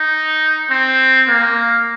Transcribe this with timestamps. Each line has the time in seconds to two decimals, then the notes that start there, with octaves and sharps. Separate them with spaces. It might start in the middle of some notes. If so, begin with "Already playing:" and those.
Already playing: D#4
0.70 C4
1.28 A#3